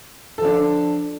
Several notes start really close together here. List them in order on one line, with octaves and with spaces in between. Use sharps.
A4 F3 D4